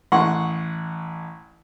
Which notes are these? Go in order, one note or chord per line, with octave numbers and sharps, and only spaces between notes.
A1 F#5 C6 C#6